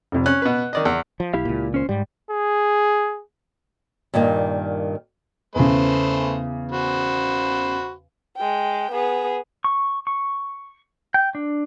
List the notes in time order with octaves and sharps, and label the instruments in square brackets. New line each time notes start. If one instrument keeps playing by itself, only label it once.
[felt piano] F1 F2
[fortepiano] C#4 [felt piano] F#6
[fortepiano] B2 B4
D#3 D5 D#5
E2
[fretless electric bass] F3
[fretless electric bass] B1 [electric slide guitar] E4 G4 F5
[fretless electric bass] C#2 A#2
[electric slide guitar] C#4 C5
[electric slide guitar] G#2 [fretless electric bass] G3
[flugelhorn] G#4
[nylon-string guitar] G2 A#2 D#3 A#3
[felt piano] E2 C#3 [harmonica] A3 B4 C5
[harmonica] F#4 C5 B5
[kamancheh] G#3 G5
B3 G#4
[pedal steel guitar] C#6
C#6
G5
D4